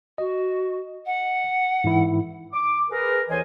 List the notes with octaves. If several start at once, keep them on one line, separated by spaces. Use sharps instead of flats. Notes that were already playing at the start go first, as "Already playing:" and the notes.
F#4 D#5
F#5
G#2 E3 E4
D6
G#4 A#4 B4
D#2 E3 C5 C#5 D#5 G#5